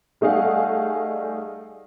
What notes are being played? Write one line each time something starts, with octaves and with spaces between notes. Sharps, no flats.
G3 A3 D#4 G#4 F5 F#5